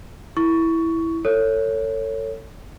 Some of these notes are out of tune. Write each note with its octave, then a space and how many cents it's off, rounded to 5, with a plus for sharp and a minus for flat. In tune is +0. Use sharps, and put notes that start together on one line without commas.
E4 -5 C#6 +15
A4 +35 C#5 +0